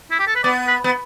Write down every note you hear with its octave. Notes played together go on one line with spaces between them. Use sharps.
E4
G4
A4
B4
B3 D5
B4
B3